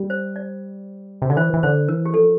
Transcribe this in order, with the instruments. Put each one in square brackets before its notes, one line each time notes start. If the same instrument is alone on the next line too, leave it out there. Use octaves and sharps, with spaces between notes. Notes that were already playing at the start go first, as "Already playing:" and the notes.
Already playing: [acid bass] G3
[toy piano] C5
D5
[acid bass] C3
[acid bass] D3 [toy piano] D5
[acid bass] E3 [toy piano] C5
[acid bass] E3
[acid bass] D3 [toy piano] C5
[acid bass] E3 [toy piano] A#4
[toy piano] G4
[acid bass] F3 [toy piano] A4